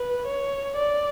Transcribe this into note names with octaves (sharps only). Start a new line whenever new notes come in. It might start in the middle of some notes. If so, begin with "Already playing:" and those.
Already playing: B4
C#5
D5